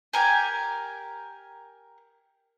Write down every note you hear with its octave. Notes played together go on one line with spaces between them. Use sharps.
G4 A#4 G#5